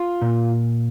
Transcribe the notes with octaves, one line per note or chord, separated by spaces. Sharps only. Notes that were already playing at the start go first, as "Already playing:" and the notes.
Already playing: F4
A#2